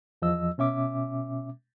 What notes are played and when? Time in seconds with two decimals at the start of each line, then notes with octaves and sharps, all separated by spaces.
0.22 E2 F3 D#5 E6
0.58 B2 C#4 E5 D6